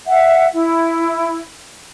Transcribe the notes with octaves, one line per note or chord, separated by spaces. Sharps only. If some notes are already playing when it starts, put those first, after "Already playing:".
E5 F#5
E4